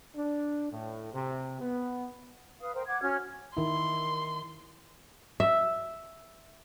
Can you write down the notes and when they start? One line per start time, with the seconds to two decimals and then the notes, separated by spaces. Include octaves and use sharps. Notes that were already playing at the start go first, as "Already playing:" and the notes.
0.16 D4
0.71 A2
1.14 C3
1.61 B3
2.60 B4 F5 D#6
2.74 A#4 C5 G5
2.87 F#5 D6 G#6
3.01 C#4 F#4 F6 G#6
3.57 D#3 E4 C6
5.40 E5